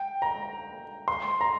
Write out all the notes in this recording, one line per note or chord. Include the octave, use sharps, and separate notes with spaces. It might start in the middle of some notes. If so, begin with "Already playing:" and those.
Already playing: G5
A#5
C6
A#5